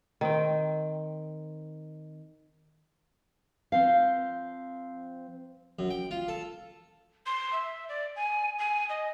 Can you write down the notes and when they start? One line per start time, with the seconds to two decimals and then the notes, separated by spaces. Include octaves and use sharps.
0.21 D#3 C4 G5
3.72 F3 C4 F5
5.79 F#2
5.90 G5
6.11 F4
6.28 A4
7.26 C6
7.53 E5
7.89 D5
8.16 G#5
8.59 G#5
8.89 D#5